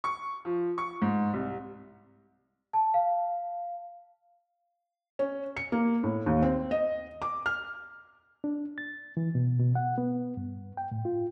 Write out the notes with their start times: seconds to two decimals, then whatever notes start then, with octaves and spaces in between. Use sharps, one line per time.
0.04 C#6
0.45 F3
0.78 C#6
1.02 G#2
1.33 C2
2.73 A5
2.94 F5
5.19 C#4
5.57 C#7
5.72 A#3
6.03 A2
6.26 D#2
6.42 C4
6.71 D#5
7.22 D6
7.46 F6
8.44 D4
8.78 A6
9.17 E3
9.35 B2
9.59 B2
9.75 F#5
9.98 B3
10.37 G2
10.77 G5
10.91 A2
11.05 F4